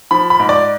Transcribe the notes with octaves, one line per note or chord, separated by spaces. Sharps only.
F3 B5
B5
G#2
D5